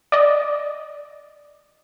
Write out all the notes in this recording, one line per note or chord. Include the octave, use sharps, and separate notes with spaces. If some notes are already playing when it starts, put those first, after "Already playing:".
D5 D#5